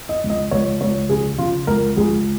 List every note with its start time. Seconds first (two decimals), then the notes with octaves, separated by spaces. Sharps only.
0.09 D#5
0.24 C#2
0.30 D#5
0.51 C#2 C#5
0.81 C#2 C#5
1.09 C#3 G#4
1.38 C#3 F4
1.67 C#2 A#4
1.97 C#2 G#4